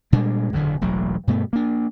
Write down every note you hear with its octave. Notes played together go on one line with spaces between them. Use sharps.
A#2 G3 G#3 D4
F#1 E2 B2 D3
E1 A1 F#3
G2 B2 A3 B3
A#3 D4